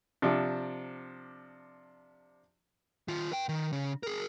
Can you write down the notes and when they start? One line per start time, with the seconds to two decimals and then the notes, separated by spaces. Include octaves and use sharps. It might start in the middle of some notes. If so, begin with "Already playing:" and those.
0.22 C3 F3 D4
3.08 D#3 F4
3.31 B4 G5
3.49 D#3
3.73 C#3
4.03 G#4 A#4